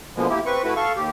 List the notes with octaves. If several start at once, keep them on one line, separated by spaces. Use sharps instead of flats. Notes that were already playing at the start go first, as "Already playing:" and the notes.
B2 D3 F3 G#3 A#3 B3
A#3 E4 G4
C4 B4 C#6
A3 E4 F#4 B4
A4 F5 C#6
D#2 G4